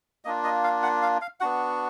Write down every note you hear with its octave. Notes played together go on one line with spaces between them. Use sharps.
A#3 D4 F4 D#5
D#5
F5
F#5
F5
F5
B3 D4 F#4 F#5